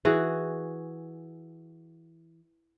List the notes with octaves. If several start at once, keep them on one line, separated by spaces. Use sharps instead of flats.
E3 F#4 G#4